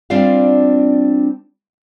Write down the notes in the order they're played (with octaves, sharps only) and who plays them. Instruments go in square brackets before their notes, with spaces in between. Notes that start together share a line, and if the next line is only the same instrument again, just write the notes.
[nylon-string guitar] G3 C4 D4 F4 D5 F5